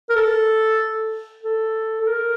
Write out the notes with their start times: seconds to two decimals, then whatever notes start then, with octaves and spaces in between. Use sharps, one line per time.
0.10 A#4
0.16 A4
1.43 A4
2.02 A4
2.07 A#4